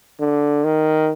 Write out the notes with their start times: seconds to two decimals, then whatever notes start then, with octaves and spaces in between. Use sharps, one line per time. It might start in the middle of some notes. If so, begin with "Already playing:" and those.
0.20 D3
0.65 D#3